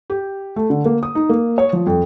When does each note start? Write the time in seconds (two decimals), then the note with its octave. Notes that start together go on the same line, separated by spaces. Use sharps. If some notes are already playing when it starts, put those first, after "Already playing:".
0.10 G4
0.56 A3
0.70 D3
0.85 A#3
1.03 D#6
1.15 D#4
1.29 A#3
1.58 C#5
1.73 F3
1.87 F2